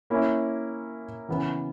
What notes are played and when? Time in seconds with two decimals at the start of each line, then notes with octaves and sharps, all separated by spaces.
0.10 A#3 C#4 E4
1.28 C#3 E3 B3